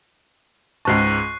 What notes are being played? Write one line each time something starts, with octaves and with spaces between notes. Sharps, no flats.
C#2 G#2 A5 C#6 F#6 C7